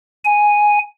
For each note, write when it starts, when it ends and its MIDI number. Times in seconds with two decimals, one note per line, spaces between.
0.25 0.78 80